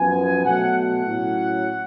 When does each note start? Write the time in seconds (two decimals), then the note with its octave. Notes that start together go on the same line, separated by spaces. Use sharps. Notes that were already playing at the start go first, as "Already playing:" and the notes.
Already playing: F#2 F3 B3 G#5
0.44 B2 F#3 A3 F#5
0.76 F#5
1.07 A2 F#3 C#4